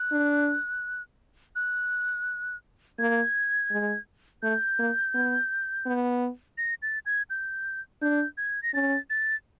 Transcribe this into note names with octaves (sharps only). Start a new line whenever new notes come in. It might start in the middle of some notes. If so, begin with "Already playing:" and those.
Already playing: F#6
D4
F#6
A#3 G#6
G#3
A3 G6
A#3
B3
B3
A#6
A6
G#6
G6
D4 G6
G#6
A#6
C#4 A6
A6